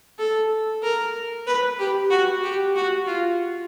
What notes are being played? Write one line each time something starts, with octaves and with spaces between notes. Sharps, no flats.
A4
A#4
B4
G4
F#4
G4
F#4
F4